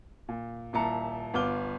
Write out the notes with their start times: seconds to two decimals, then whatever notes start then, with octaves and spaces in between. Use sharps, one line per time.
0.29 A#2
0.73 D#1 A#2 E4 A5 A#5 C#7
1.34 G1 B3 F4 D6 F6 G7